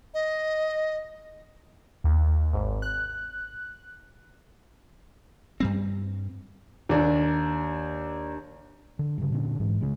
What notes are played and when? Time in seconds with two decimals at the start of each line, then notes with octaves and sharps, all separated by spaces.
0.14 D#5
2.04 D#2
2.53 G#1
2.82 F#6
5.60 G2 G3 C4
6.89 D#2 D4
8.99 D3
9.18 G2 C#3
9.32 A#2 D3 C#4
9.60 G#2 E3
9.81 C#3 G#3